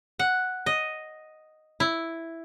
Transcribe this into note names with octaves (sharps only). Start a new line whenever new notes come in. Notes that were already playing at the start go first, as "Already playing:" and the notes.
F#5
D#5
E4